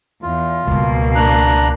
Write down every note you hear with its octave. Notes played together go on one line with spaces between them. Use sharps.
E2 F4
C#2 B2 G3 A#3
D4 A#5 F#6